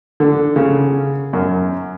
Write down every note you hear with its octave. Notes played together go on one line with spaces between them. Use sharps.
D3
C#3
F#2